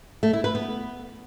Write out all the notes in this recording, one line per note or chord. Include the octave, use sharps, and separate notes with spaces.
A3
E4
B4
B3